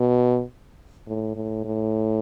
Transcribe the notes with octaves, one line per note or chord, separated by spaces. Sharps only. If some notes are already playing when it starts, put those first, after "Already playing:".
Already playing: B2
A2
A2
A2